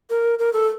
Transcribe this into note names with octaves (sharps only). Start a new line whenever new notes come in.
A#4
A#4
A4